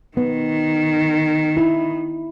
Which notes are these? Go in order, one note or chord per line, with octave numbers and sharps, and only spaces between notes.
D#3 B3
E4